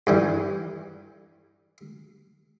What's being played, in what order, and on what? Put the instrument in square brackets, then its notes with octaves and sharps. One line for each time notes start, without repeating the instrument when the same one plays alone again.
[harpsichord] G2 E3 G3